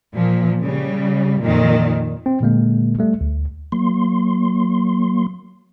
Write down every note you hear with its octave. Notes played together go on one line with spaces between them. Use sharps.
A#2 F3
C#3 G3
F2 A#2 D#3
C4
A#2 D3 G#3 A#3
G3 A3
D2
F#3 A#3 C6